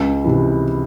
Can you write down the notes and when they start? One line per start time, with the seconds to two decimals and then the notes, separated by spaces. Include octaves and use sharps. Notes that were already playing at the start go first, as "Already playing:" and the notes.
Already playing: C#2
0.24 C3 E3